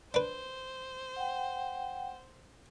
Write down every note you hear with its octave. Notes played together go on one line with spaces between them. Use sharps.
D4 B4 C5
F#5 G5